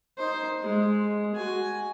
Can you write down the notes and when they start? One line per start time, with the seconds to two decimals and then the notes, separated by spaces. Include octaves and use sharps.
0.18 D#4 C5
0.63 G#3
1.35 F#4 G#5